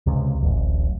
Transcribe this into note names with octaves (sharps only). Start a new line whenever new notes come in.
C#2 C3
D1 A1